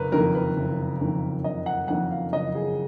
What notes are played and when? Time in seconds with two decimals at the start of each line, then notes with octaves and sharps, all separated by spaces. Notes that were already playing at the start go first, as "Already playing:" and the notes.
Already playing: F#1 A#4 B4
0.12 F2 D#3 A#3 A#4
0.35 B4
0.57 F#1
1.01 F2 D#3 A#3
1.44 F#1 D#5
1.66 F#5
1.88 F2 D#3 A#3 F#5
2.11 F5
2.33 F#1 D#5
2.55 G#4